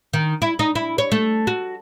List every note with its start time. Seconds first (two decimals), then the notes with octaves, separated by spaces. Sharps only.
0.13 D#3
0.42 E4
0.59 D#4
0.75 E4
0.98 C#5
1.12 A3
1.47 F#4